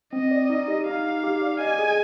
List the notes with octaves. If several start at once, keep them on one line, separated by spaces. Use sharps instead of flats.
C4 D#5
D5
D#4
G4
D#4 F5
D#4
G4
D5
D#5 G#5
G#4